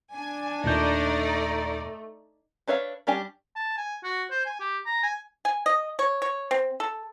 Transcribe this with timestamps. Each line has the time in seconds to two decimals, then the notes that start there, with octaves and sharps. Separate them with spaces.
0.13 D4 G#5
0.64 D#2 A#2 A3 D#4 D5 G6
2.67 D4 B4 C#5 E5 F5
3.07 G3 C#4 D4 G4 G#5
3.56 A5
3.77 G#5
4.04 F#4
4.31 C5
4.46 G#5
4.60 G4
4.86 A#5
5.03 G#5
5.45 G#5
5.66 D#5
5.99 C#5
6.22 C#5
6.51 C4
6.80 A4